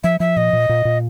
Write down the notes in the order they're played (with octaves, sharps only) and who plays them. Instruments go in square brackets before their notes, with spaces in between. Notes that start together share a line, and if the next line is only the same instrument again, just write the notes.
[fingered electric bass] F3 [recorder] E5
[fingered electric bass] F3 [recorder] E5
[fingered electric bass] A#2 [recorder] D#5
[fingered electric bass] A#2
A#2
A#2